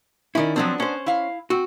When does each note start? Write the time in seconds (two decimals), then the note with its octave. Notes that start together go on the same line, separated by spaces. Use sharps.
0.35 D#3 C#4 E4 D5
0.56 F3 F#3 B3 C4 D4
0.80 C#4 C5
1.06 E4 F5
1.50 C4 F#4